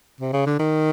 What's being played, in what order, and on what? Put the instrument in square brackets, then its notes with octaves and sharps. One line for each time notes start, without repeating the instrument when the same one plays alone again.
[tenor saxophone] C3
C#3
D3
D#3